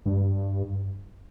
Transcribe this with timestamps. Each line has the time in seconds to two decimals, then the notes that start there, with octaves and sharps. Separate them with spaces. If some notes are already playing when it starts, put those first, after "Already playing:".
0.06 G2